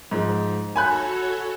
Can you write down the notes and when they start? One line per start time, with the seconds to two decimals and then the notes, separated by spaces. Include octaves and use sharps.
0.11 G#2 F3
0.76 F#4 A4 C#5 G#5 B5 F#6